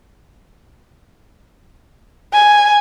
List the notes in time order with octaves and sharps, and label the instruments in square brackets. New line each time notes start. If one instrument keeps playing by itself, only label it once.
[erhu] G#5